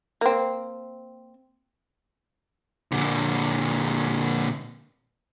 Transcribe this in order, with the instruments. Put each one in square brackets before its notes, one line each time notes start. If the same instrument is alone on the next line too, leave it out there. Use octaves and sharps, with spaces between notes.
[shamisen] A#3 C4
[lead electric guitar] A#2 D3